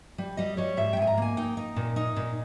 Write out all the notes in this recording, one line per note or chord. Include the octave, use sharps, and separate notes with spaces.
G3
G3 D#5
G3 C#5
G#2 E5
G5
G#2 G#5
A#5
A#3 G#5
D#4 G5
D#4
A#2
D#4
A#2